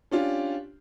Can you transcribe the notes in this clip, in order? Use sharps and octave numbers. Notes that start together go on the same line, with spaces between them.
C#4 D4 F4 G4